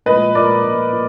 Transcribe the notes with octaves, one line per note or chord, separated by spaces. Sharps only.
A#2 F3 G#3 B4 D#5
A#2 F3 G#3 A#4 D5
A#2 F3 G#3
A#2